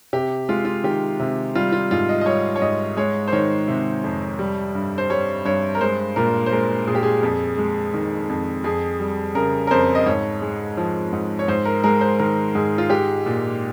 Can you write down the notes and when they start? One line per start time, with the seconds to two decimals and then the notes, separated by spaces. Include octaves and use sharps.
0.13 C3 G4
0.49 G#3 F4
0.65 F4
0.84 D#3 G4
1.20 C3
1.55 G3 F4
1.72 F4
1.91 G#2 F4
2.09 D#5
2.21 D#5
2.26 G3 C#5
2.56 C#5
2.62 G#2 D#5
2.97 G#3 C#5
3.28 C5
3.33 D#3 C#5
3.68 C3
4.04 F2
4.39 G3
4.75 G2
4.98 C5
5.10 G3 C#5
5.45 G2 C#5
5.75 A#4
5.81 G#3 C5
6.16 A#2 A#4
6.46 C5
6.52 G#3 A#4
6.87 A#2 G#4
6.95 G4
7.03 G#4
7.23 F2
7.58 G#3
7.94 D#3
8.29 F2
8.64 F2 G#4
9.00 G3
9.35 C#3 A#4
9.67 A#4
9.71 F2 C5
9.95 D#5
10.06 G#2 C#5
10.42 G#3
10.77 F3
11.13 G#2
11.39 C#5
11.48 G#2 C5
11.65 A#4
11.84 G#3 A#4
12.01 C5
12.19 D#3 A#4
12.55 G#2 G#4
12.78 F4
12.90 G#3 G4
13.26 A#2